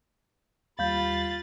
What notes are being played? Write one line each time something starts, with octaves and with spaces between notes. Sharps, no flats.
D#2 G3 F4 G4 F5 B5 G6 A6